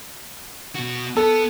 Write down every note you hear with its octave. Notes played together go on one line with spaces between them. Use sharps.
B2 F#4
B3 A4